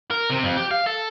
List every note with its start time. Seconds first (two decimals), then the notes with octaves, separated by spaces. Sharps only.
0.11 A#4
0.30 C3
0.43 F2
0.57 G4
0.71 F5
0.86 A4